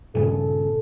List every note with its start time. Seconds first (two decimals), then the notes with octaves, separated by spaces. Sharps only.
0.15 G2 A#2 C#3 A4